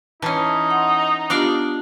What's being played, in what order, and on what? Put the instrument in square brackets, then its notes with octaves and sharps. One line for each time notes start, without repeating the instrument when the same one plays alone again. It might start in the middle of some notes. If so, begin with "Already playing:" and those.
[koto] E3 C#4 [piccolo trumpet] D#4 [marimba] A5
[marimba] F#5 C6
[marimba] B3 F4 G4 [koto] D4 D5 F5